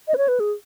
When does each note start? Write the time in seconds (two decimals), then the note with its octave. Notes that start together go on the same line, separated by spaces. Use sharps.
0.08 D#5
0.14 B4
0.18 C#5
0.28 B4
0.40 G#4